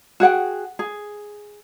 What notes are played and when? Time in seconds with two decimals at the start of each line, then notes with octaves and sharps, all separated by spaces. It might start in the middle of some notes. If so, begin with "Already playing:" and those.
0.20 F#4 G#4 F#5 G5
0.79 G#4